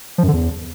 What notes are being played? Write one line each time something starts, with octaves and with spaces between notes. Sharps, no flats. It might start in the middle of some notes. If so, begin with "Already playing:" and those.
F3
F#2
D3
E2